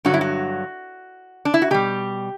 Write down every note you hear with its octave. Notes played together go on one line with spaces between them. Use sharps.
G2 D3 F#3 F#4
E4
F#4
D4
E4
F#4
B2 G3 G4